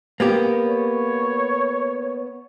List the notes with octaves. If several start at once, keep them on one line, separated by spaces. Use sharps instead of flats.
A#3 B3 G4
C#5